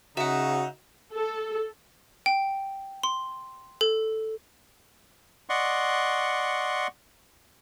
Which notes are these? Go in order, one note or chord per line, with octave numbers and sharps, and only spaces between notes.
C#3 D#4 F#4 E5 F#5
A4
G5
C6
A4
D5 D#5 F#5 C6 C#6